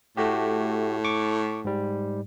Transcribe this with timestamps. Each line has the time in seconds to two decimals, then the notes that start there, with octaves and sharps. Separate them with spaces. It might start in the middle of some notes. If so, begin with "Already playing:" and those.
0.17 A2 A3 F#4 G4
1.04 C#6 D6
1.65 G#2 G3